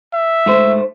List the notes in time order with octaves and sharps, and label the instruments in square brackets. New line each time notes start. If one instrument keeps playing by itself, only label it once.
[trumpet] E5
[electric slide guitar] G#2 A3 C5